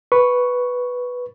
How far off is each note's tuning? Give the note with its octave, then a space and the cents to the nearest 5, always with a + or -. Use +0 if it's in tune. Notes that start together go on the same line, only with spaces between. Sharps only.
B4 +0 C#6 +0